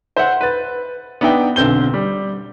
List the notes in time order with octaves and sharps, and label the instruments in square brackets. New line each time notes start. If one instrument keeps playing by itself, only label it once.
[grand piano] C5 E5 F#5
B4 A6
B3 D4 D#4 E5 G5
B1 D3 C4 G6 G7
G3